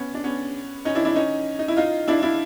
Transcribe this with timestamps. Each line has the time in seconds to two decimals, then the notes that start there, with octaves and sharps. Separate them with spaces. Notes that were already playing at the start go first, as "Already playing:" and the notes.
Already playing: B3 C#4
0.14 D4
0.24 B3 C#4
0.85 C#4 D#4
0.95 D4 E4
1.05 D4 E4
1.15 C#4 D#4
1.59 D#4
1.68 E4
1.77 D#4 F4
2.08 D4 E4
2.22 D4 E4